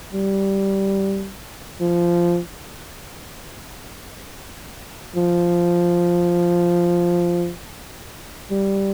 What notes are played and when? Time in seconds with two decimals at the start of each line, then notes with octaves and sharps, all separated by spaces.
0.13 G3
1.80 F3
5.16 F3
8.51 G3